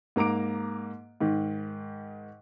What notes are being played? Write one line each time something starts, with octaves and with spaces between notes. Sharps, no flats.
G#2 A#3 A#5 D6 D7
G#2 D#3